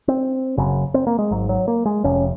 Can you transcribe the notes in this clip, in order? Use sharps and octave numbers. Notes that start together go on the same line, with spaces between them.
C4
F#1 F#2 C#3
C4
A#3
G#3
G#1 G#2 F#3
F#3
A#3
G#3
F1 F2 C3 C#4